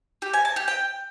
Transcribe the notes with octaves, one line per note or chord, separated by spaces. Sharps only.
G4
G#5
A5
G4
G5